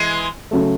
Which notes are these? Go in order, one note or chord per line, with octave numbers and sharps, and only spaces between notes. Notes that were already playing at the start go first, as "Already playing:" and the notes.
Already playing: E3 G#3
C#3 F#3 A3